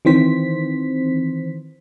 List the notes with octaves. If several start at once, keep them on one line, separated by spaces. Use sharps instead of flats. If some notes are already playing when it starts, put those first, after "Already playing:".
D#3 E3 C4 C5 B6